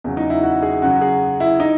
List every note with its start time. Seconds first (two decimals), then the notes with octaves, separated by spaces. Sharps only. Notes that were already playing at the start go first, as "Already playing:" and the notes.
0.04 E2 C#3 F#3
0.17 D#4
0.30 E4
0.43 F#4
0.63 G#4
0.82 F#2 C#3 F#3 F#4
1.01 G#4
1.40 E4
1.60 D#4